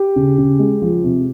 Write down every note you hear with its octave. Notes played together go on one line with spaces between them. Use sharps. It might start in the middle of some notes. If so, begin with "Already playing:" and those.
Already playing: G4
C#3
C#3
G#3
F3
C3